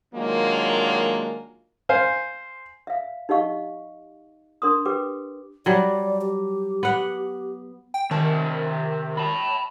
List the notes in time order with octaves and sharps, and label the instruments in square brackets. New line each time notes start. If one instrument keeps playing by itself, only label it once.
[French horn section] D#3 F#3 G#3 A#3 D4 F4
[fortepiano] C5 F5 G#5
[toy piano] E5 F5
D#4 G4 D#5 F5 C#6
D4 A#4 C6 D#6
G4 B4 G5 D6
[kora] F#3 G3 [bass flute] D5
[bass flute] G4
[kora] B3 F#5
[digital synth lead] G5
[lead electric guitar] C3 A5 [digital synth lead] D#3
[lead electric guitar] A5 B5